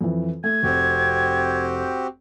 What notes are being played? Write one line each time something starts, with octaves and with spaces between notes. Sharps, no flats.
F2 E3
A3 G#6
F1 C4 F#4 G4